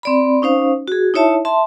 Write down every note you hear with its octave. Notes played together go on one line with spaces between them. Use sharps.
C4 D5 B5
C#4 D#4 C5 F5
F#4 G#4
D#4 E4 C#5 E5 A5
E5 A5 C6